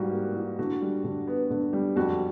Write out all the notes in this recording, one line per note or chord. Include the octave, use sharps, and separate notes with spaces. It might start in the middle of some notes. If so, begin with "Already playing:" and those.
Already playing: G#2 E3 G3 A#3 F#4
A#3
E3
D3 F#4
G3
D3
B3
D3
G3
F2 F#4